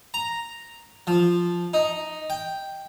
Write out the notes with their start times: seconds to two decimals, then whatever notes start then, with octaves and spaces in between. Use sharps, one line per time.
0.14 A#5
1.07 F3
1.73 D#4
2.30 G5